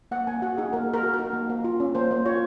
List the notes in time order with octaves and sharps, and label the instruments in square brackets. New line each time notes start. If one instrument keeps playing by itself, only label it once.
[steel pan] A#3 F#5
A#3 G#5
F#4 F#5
D#4 G#4
A#3 A#4
A#3
A#4
F#4
A#4
D#4
A#3
A#3
F4
C#4
A#3 C5
A#3
F4 C#5